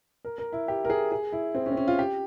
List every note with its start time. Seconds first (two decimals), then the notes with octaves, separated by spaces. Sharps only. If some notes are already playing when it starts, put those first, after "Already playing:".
0.25 A#4
0.38 A#4
0.53 E4
0.68 G4
0.85 A#4
0.90 G#4
1.12 G#4
1.32 E4
1.55 C4
1.66 C#4
1.72 C4
1.77 C#4
1.88 F4
1.99 G4